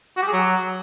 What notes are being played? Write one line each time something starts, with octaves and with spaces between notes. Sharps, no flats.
F#4
G4
G#4
F#3